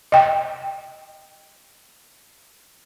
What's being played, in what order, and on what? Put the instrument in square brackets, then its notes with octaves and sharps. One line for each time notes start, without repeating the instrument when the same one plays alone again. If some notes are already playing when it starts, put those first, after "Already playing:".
[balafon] D#5 G5